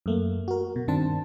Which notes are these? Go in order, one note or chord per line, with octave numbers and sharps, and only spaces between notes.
F#2 A3 A#3
F#4 A#4
B2
G2 D#3 C4 D4 C5 A5